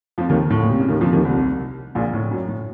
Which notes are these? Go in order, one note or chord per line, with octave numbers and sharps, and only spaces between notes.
F2 F3
D#2 D#3
A2
A#2
C3
C#3
D#2 D#3
F2 F3
D#2 D#3
C2 C3
A#1 A#2
A2
F#2
A2